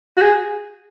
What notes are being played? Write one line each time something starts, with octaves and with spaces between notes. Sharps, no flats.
F#4
G#4